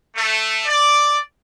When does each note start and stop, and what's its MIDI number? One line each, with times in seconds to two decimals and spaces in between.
0.15 0.61 57
0.65 1.17 74